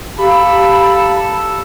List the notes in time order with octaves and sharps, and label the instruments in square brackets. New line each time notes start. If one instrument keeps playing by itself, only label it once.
[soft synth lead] G4 [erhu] A4 [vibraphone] F5 A#5 [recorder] B5